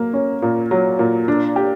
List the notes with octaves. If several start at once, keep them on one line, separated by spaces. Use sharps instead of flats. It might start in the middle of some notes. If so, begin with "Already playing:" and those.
Already playing: F#3 A#3
C#4
A#2
F#3
A#2
D4
G4